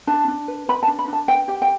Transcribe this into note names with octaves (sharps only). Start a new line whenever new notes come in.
D4 A5
D4
B4
B4 B5
A5
D4
B5
D4 A5
B4 G5
G4 G5
G5